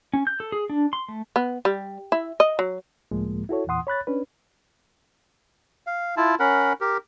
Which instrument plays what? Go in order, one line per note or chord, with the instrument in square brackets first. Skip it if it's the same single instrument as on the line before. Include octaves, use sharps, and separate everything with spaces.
[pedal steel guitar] C#4
G6
A4
G#4
D4
C6
A3
[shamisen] B3
G3
E4
D#5
F#3
[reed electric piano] C#2 A2 F3 G#3 A#3
E4 F#4 A4 C#5
E2 A#2 E3 F#5 C6 D#6
C#5 B5 F#6 A6
C#4 D4 B4
[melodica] F5
E4 F4 A5
C#4 A#4 F#5 B5
G4 A#4